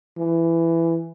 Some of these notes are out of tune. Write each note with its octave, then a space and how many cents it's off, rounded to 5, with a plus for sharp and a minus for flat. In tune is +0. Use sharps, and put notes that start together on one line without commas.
E3 +15